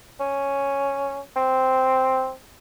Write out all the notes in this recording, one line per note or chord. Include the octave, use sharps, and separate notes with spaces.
C#4
C4